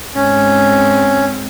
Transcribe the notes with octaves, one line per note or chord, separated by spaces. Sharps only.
G#2 C4 C#4